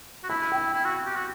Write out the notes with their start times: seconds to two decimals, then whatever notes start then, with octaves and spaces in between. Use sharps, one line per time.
0.24 F#4
0.29 E4 B5
0.52 G5
0.73 E4
0.85 F#4
1.06 G4
1.16 F#4